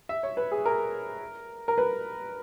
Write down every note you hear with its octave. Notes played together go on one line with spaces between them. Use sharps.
E5
C#5
B4
G#4
A#4
A#4
B4